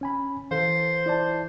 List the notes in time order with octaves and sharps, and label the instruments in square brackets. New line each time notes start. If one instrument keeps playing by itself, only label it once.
[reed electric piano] C#4 G#5 B5
[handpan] E3 A4 [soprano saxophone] C5 [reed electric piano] F5
[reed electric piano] E4 D5 A5